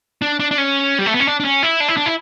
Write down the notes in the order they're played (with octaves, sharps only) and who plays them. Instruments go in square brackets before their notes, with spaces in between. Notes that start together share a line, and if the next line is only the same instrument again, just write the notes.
[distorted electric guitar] D4
D4
D4
C#4
G3
A3
B3
C#4
D4
D4
C#4
E4
D4
E4
D4
E4